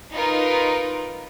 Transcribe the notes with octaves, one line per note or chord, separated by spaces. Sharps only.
D#4 F4 A#4 B4